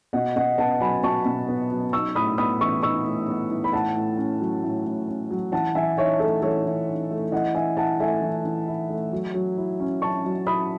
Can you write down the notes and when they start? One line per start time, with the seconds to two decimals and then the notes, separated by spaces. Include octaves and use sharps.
0.13 B2 D#5 F#5
0.36 B2 D#5 F#5
0.58 B3 F#5 A5
0.80 F#3 G#5 B5
1.03 B2 A5 C#6
1.25 B2
1.49 B3
1.71 F#3
1.93 D#4 C#6 E6
2.15 A2 B5 D#6
2.38 B3 B5 D#6
2.61 E3 C#6 E6
2.83 D#4 C#6 E6
3.06 A2
3.28 B3
3.51 E3
3.64 B5
3.72 A2 F#5 A5
3.96 A2
4.17 C#4
4.40 F#3
4.63 A2
4.86 A2
5.08 C#4
5.30 F#3
5.52 E3 F#5 A5
5.75 E3 E5 G#5
5.98 D#4 C#5 E5
6.20 A3 A4 C#5
6.42 E3 A4 C#5
6.66 E3
6.87 D#4
7.11 A3
7.32 E3 D#5 F#5
7.55 E3 E5 G#5
7.77 E4 F#5 A5
8.00 A3 E5 G#5
8.22 E3
8.45 E3
8.67 E4
8.90 A3
9.12 F#3
9.34 F#3
9.57 E4
9.80 C#4
10.02 F#3 A5 C#6
10.25 F#3
10.47 E4 B5 D#6